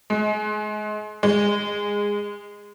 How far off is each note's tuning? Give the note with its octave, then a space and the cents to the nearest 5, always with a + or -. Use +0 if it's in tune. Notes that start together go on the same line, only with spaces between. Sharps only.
G#3 +30
G#3 -20